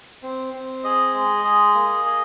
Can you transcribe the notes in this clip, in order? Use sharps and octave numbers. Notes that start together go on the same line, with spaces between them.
C4
C4
G#4 D#5
G#3
G#4
A#3
G#4